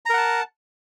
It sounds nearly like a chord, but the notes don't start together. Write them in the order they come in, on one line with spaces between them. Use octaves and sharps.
A#5 A#4 F#5 A5